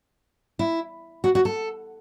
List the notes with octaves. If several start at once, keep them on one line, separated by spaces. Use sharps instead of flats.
E4
F#4
F#4
A4